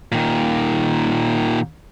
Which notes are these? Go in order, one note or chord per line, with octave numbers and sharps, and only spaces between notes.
A#2 D#3